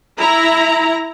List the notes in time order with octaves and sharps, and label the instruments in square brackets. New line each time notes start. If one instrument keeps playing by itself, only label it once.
[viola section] E4 A#5